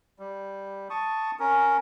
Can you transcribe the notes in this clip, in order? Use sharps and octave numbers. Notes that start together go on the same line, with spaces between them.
G3
A5 C#6 D#6
C#4 A#4